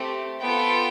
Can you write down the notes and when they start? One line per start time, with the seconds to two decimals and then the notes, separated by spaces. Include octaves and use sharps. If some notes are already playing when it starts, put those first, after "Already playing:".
Already playing: A3 C4 G4
0.42 B3 F4 A4 G5